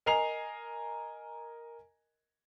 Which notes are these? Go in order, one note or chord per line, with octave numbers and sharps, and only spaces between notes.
A#4 D#5 G#5 A#5 C7 F7